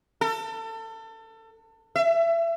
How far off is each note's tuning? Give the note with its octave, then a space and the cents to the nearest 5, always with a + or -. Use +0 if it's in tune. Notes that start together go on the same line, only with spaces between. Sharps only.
A4 +30
E5 +25